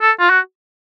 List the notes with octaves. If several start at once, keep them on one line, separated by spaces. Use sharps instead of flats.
A4
F4
F#4